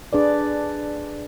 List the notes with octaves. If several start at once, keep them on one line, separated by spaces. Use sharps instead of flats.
D4 G#4 B4 D5